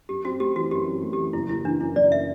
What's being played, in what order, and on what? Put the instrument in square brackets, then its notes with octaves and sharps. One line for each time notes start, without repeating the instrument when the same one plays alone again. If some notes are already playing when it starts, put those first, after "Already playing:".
[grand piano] F#2 [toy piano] G4
[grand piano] C4 [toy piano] F#4
[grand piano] A3 [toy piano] G4
[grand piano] E3 [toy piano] F#4
[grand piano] F#2 [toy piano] G4
[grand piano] C4
A3
[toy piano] G4
[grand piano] E3
[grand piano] F#1 [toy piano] E4
[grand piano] F#1 [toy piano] E4
[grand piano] E3 [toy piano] D4
[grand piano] F#2 [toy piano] E4
[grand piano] F#1 [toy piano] D5
[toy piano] E5